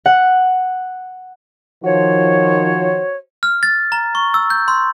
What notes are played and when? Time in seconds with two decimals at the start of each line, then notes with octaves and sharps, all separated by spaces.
0.06 F#5
1.84 D#3 F3 F#4 C5 C#5
3.43 F6
3.63 A6
3.92 A#5
4.15 C#6
4.34 E6
4.50 G6
4.68 C6